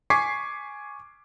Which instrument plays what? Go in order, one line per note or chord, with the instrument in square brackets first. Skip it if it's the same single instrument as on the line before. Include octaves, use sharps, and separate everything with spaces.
[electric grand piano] G#5 C#6 D6 G#6 B6 C7